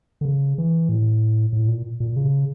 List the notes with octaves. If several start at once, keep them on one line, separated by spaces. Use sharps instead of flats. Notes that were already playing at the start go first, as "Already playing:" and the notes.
D3
C#3
E3
A2
A2
A#2
A#2
C#3